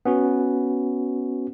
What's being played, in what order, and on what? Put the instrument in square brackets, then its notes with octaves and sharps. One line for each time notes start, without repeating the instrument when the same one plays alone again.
[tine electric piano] B3 C#4 F#4